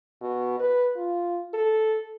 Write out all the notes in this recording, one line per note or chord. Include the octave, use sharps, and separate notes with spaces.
B2
B4
F4
A4